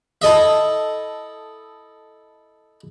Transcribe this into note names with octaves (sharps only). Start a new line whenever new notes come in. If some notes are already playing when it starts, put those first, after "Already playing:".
E4 A4 D#5 E5